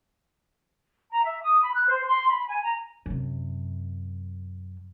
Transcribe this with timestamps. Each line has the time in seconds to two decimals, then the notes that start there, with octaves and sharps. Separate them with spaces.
1.10 A#5
1.24 E5
1.42 D#6
1.60 B5
1.72 F#6
1.87 C5
2.06 C6
2.27 B5
2.47 G#5
2.62 A#5
3.06 F#2 C3